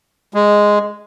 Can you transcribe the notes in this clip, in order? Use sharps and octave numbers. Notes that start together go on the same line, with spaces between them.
G#3